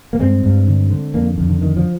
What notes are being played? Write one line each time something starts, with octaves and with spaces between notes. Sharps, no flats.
A#3
G2 G#3 C4
G2
D3
D3
F2 A#3 D4
F2 D3
D3
D3 D#3
D3 F3